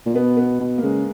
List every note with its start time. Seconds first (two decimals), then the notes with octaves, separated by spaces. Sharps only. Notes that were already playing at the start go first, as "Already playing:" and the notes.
0.06 A#2
0.15 B2 B3
0.37 B3
0.60 B2
0.78 A#3
0.83 C#3 G#3